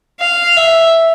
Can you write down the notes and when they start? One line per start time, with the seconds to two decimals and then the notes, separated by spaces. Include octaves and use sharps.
0.20 F5
0.57 E5